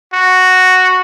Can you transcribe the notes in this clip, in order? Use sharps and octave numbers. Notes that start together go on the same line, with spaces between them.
F#4